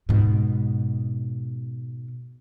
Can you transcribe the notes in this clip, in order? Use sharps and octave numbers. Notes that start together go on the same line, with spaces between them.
G#2 B2